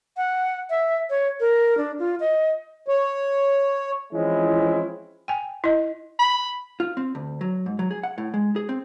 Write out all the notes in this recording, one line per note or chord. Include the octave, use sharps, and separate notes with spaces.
F#5
E5
C#5
A#4
D4
F4
D#5
C#5
E3 F3 G#3 C4 C#4 E4
G5 G#5
E4 D#5
B5
F4
C4
D2
F#3
G#2
F#3
G#4
F#5
A2
G#3
G#4
C4